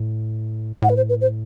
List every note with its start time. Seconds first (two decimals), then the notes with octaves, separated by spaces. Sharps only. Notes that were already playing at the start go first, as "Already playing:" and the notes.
Already playing: A2
0.82 A2 F#5
0.89 B4
0.96 C5
1.09 B4
1.21 C5